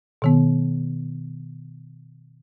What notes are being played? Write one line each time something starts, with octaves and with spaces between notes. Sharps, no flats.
B2 D#3 B3